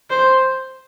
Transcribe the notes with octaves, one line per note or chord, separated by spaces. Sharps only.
C5